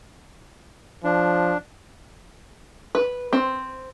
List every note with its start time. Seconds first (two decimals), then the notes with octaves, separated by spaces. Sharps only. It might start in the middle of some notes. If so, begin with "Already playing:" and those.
1.04 F3 D4
2.95 B4
3.33 C4